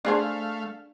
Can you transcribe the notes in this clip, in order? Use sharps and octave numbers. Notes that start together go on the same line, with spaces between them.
A3 D4 G#4 C5 F5